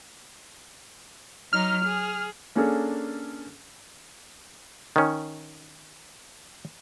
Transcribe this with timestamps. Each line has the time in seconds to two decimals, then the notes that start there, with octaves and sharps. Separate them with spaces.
1.53 F#3 D#4 F6
1.84 G#4
2.55 A#3 C#4 D4 G#4 A4
4.96 D#3 C#4